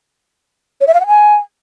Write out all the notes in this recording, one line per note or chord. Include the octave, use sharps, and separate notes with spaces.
C#5
E5
F5
F#5
G#5